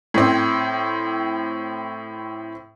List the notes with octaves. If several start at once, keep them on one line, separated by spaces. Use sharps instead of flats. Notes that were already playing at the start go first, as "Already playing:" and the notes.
A2 C4